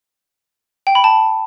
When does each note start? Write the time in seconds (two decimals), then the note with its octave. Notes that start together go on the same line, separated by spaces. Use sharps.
0.87 G5
0.95 B5
1.04 A5